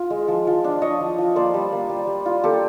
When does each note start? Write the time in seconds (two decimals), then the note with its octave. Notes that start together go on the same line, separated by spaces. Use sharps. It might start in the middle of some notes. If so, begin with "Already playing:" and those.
Already playing: F4
0.10 G#3
0.28 F3
0.47 F3
0.64 D4
0.82 D4 C#5 D#5
1.01 F3
1.18 F3
1.36 A#3 C5 D5
1.54 G3
1.72 A#3
1.89 G3
2.07 G3
2.26 F4
2.44 A#3 G4 A4